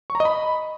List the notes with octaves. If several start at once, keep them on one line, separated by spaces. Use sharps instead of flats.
C#6
A#5
D#5
B5